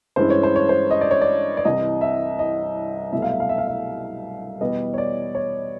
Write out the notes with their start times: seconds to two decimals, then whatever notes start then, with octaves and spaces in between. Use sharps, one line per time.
0.16 G2 E3 G#3 C#4 E4 C5
0.30 C#5
0.43 C5
0.56 C#5
0.69 C5
0.91 D#5
1.01 D5
1.11 C#5
1.21 D5
1.57 D5
1.65 C2 C3 E3 D#5
2.01 E5
2.39 D#5
3.13 C2 B2 F#3 A3 E5
3.22 F5
3.31 E5
3.40 F5
3.49 E5
3.58 F5
3.68 E5
4.61 E2 B2 G3 B3 D#5
4.94 C#5
4.98 D5
5.35 C#5